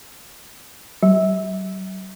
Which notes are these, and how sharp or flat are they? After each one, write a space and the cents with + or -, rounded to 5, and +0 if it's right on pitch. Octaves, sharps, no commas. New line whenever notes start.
F#3 +45